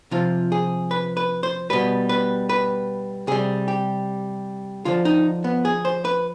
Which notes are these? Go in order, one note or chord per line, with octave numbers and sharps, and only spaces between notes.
C3 F3 F4
G#4
B4
B4
C5
B2 G3 B4
B4
B4
C3 G3 G#4
G4
D3 F3 F4
D#4
B3
G#4
C5
B4